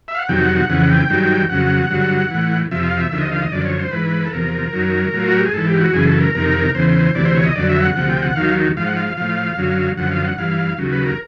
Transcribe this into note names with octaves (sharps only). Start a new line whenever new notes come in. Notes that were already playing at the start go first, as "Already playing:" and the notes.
E5
F5
F#5
F2 C3 D#3 F#3 G5
F#5
F#5
F2 C#3 E3 F#5
G5
G2 D#3 F#3
F2 C#3 F#3 F#5
G2 D3 F#3
A2 E3
F2 C3 F3 E5
F5
E5
D#2 D3 F3 E5
D#5
F5
D#5
F#2 D3 F3 D5
C#5
C5
G#2 E3 B4
A4
E2 C3 F3 A#4
F#2 D#3 F#3
A2 F#3
F4
F#4
G4
G#4
G#2 E3 A4
G4
F#4
F#2 C#3 E3 G#4
A4
A#4
F2 C3 D#3 A#4
E2 C#3 E3 C5
D2 C3 E3 D5
C5
C#5
D#5
F2 D3 F#3 D5
E5
F#5
D2 C3 F3 F#5
G5
F#5
D#2 D#3 F#3 F5
G#2 F3 F5
F#5
F5
F5
A2 F3 F5
F#2 D3 F#3
F#2 D3 F3 F#5
F5
F#5
G2 E3 F5
D#2 C#3 F#3
B4
A#4